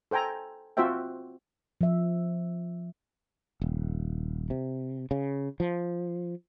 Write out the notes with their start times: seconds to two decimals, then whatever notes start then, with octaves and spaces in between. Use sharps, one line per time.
0.11 A4 C5 G5 G#5 A#5
0.77 C4 F4 F#4 C5 E5 G5
1.81 F3 E5
3.62 D#1
4.50 C3
5.11 C#3
5.60 F3